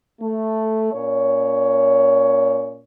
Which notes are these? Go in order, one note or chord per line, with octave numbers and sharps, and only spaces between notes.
A3
A#2 C#4 C#5